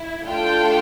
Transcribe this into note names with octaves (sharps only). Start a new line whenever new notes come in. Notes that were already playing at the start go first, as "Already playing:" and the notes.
Already playing: E4
A3 D4 F4 A4 G5